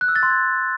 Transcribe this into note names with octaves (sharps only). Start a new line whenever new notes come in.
F#6
E6
A6
C6
G#6